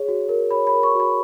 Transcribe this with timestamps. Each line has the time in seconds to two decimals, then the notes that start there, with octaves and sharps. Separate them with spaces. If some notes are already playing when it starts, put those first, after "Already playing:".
Already playing: G#4 C#5
0.08 F#4
0.29 A#4
0.51 C#5 B5
0.67 B5
0.73 A#4
0.83 C#6
0.95 F#4 B5